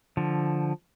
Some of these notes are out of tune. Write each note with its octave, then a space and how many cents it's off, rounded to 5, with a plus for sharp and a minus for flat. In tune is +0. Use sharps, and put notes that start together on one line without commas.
D3 +0 F3 +0